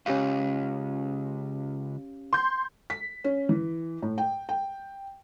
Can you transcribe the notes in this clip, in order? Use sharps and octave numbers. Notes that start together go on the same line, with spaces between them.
C#2 C#4 G4 F5
C6 G6
B6
C#4
E3
A2
G5
G5